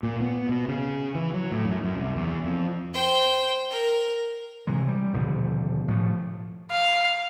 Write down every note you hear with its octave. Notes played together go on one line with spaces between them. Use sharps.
A#2
B3
B2
C#3
E3
F#3
A2
F#2
F#2
C2
E2
F2
C5 G5
A#4
C3 E3 F#3 G#3
G3
D#1 B2 D3 F3
A2 F3 A3
F5